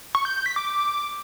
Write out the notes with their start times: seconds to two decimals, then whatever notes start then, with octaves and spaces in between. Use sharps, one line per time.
0.15 C#6
0.25 G6
0.35 G6
0.46 B6
0.56 D6